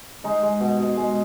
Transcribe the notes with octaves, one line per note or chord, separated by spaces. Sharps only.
G#3 D#4
G#3
B2
B2
G#3